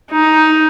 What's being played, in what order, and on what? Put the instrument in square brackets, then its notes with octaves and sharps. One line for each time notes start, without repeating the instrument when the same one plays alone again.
[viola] D#4